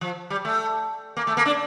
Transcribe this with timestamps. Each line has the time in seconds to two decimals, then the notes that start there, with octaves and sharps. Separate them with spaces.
0.01 F3
0.30 G3
0.45 A3
1.17 A#3
1.27 A3
1.37 A#3
1.46 D4